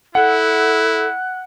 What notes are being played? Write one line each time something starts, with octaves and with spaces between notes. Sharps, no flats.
E4 A4 F#5 F#6